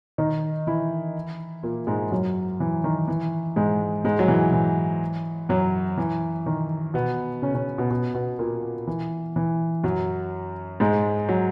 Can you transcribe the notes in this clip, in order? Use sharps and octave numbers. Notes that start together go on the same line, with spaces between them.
D#3 D#4
E3 E4
A#2 A#3
G#2 G#3
F#2 F#3
E3
D#3
E3
G#2 G#3
G#2 G#3
F#3
E3
E3
F#2 F#3
E3
D#3
B2 B3
C#3 C#4
C#3 C#4
B2 B3
B2 B3
B2 B3
A#2 A#3
E3
E3
F#2 F#3
G#2 G#3
F#3